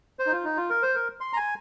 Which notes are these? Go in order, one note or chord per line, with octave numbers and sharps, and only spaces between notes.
C5
D#4
F4
D#4
F4
A#4
C5
A#4
C6
A#5
G#5